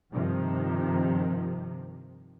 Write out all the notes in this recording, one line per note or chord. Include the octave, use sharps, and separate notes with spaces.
G2 C3 D#3 F3